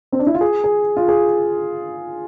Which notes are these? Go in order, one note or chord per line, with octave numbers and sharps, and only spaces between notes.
C4
D4
E4
F4
G#4
G#4
F4
G#4